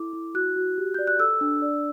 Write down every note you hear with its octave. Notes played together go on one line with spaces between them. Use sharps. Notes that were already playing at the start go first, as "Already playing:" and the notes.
Already playing: E4 A4 D6
E4
F#4 F#6
F#4
G4
D5 G6
F#6
A4 E6
D4
D5